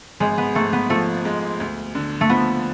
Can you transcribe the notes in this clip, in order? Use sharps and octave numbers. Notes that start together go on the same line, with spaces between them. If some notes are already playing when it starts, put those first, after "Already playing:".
G#1 G#3
B3
G#2 A3
B3
F3 A3
G#3
D2
D3
A3
F3 B3